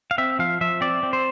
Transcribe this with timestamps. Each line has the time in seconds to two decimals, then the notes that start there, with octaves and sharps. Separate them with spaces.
0.11 F5
0.18 C4 E5
0.39 F3 F5
0.61 F3 E5
0.81 C4 D5
1.03 C4
1.13 C5